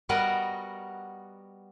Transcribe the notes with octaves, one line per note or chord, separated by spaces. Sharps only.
G3 B3 F#4 A#4 D#5 F#5